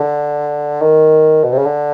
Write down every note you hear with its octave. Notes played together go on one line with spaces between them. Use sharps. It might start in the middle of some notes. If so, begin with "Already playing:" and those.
Already playing: D3
D#3
B2
C3
C#3
D3